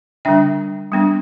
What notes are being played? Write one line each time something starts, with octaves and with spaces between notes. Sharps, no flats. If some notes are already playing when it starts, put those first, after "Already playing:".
D3 G3 D4 E5 G5
G3 B3 D4